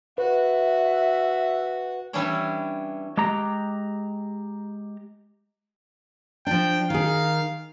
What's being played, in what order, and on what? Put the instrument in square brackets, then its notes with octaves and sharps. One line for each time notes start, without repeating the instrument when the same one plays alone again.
[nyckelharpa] F#4 [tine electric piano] B4 [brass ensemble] E5
[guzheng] E3 G3 B3 C#4 D4 C#5
[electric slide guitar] G#3 G4 A#5
[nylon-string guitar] F3 D4 [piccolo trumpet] G5
[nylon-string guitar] D#3 G#4 [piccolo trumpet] F5